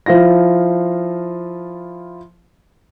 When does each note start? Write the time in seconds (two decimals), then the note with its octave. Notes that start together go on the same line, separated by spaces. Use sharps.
0.06 F3 E4 F4 A#6